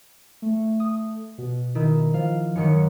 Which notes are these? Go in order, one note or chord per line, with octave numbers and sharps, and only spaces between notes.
A3
D#6
B2
D#3 E4
F3 F5
F#2 D#3 F#3 C#7